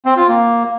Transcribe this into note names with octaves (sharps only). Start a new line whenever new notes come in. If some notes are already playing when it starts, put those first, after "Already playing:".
C4
F4
A#3